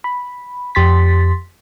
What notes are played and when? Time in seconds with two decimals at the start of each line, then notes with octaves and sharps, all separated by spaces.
0.04 B5
0.75 F2 G4 C6 A6 B6